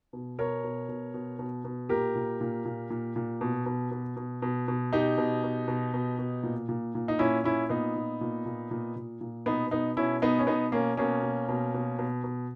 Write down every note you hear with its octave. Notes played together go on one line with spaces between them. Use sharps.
B2
B2 A#4 C#5
B2
B2
B2
B2
B2
A#2 G4 A#4
A#2
A#2
A#2
A#2
A#2
B2
B2
B2
B2
B2
B2
B2 D#4 G4
B2
B2
B2
B2
B2
A#2
A#2
A#2
D#4
A#2 C#4 E4
A#2 C#4 E4
A#2 B3 D#4
A#2
A#2
A#2
A#2
A#2
A#2
B2 B3 D#4
B2 B3 D#4
B2 C#4 E4
B2 B3 D#4
C#4
B2 B3 D#4
B2 A#3 C#4
B2 A#3 C#4
B2
B2
B2
B2
B2